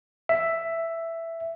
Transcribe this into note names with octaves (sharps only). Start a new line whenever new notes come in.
E5